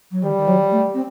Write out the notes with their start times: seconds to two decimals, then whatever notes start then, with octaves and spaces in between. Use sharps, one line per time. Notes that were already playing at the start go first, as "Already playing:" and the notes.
0.11 F#3
0.24 D#3 G3
0.37 D#3
0.48 F#3
0.71 A3
0.94 C4